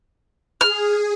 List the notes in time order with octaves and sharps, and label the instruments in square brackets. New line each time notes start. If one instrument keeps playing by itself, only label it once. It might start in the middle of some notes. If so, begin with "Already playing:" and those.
[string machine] G#4 [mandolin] F6